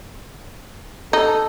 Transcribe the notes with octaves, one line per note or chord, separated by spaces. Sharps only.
D#4 A4